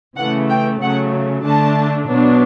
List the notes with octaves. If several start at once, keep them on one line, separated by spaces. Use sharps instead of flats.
C#3 E3 A3 F#5
G5
C#3 F#3 A3 F#5
D3 A3 D4 A5
B2 F#3 B3 D4